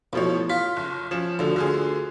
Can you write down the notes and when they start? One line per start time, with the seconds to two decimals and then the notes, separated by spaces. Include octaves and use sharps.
0.13 A1 B2 F3 C#5
0.50 F4 B6
0.77 F#1
1.11 F3 C#4 E7
1.39 D2 D3 F3
1.56 D3 F4 G#4